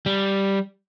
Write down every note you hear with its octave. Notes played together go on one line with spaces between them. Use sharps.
G3